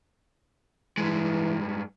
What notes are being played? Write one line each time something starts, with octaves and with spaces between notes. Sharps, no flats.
G2 E3 G#3